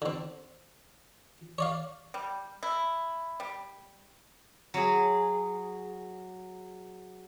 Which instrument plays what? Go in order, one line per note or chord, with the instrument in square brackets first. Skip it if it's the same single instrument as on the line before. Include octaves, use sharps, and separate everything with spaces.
[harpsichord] D3 C4
C#5 D5 F5
[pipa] G3
E4
G3
[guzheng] F#3 G#4